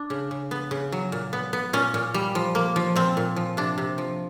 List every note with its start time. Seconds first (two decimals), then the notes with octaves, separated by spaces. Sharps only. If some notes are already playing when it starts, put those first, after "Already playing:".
Already playing: D4
0.10 C#3
0.31 C#3
0.51 B3
0.71 C#3
0.92 F#3
1.12 A#2
1.33 B3
1.53 B3
1.73 A#2 C#4
1.94 A#2
2.14 G3
2.35 F3
2.55 A#3
2.76 F3
2.96 A#2 C4
3.17 A#2
3.36 F3
3.57 C3 D4
3.78 C3
3.98 F3